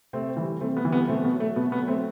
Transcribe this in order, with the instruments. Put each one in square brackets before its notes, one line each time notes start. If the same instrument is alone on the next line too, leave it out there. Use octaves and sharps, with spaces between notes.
[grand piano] C3 A3 C4
E3 G3
C3 A3 C4
B3
E3 G3
B3
B2 A3 C4
B3
F#3
A3
B2 B3
B3
F#3
A3 C4